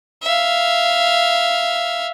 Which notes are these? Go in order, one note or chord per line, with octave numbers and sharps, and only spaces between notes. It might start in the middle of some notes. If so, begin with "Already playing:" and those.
E5 F5